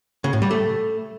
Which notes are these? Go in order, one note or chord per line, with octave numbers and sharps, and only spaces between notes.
C#3
A2
G3
A3